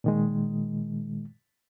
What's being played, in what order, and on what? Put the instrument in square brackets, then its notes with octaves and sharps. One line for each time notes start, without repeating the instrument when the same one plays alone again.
[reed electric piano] A#2 D#3 G#3